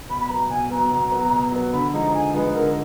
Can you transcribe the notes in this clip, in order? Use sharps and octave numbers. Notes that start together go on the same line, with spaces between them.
B2 B5
B5
F#3 B3 A#5
B2 G#5
F#3 B3 A#5
B2
F#3 B3
B2
F#3 B3
D3 B5
F3 G#3 D#4 A#5
D3 G#5
F3 G#3 D#4 B4
D3 A#4